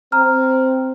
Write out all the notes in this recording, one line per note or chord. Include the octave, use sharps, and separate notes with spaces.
C4 A#5 F6